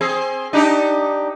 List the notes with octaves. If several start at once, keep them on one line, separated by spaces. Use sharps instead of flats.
C4 G#4
D4 D#4 G4